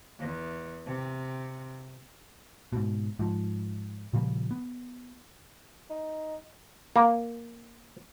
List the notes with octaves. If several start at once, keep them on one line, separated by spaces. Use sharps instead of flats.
E2
C3
G#2 B2
G#2 F3
A#2 C#3 F3 G3
B3
D#4
A#3